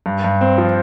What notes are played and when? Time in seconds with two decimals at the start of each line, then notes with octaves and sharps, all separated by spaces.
0.06 G2
0.24 G2
0.41 C4
0.58 F3